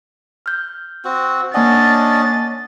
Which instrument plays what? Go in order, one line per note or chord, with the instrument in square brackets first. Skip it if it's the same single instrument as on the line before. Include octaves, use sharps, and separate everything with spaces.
[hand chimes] F6 G6
[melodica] C4 F#4
[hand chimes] A#3 F#5 [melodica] C#4 D4 D#5 [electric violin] A6